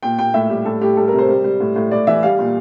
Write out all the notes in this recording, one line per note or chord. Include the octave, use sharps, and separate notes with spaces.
A#2 G5
A#2 G5
A2 E5
G3 G4
A2 A4
A2 G4
G3 A4
C3 A#4
C5
G3
G3
A2
A2
A2 D5
E3 E5
G3 F5
A#2